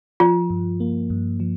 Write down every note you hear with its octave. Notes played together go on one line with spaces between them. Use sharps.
F3 F4
G2
A#3
G2
F3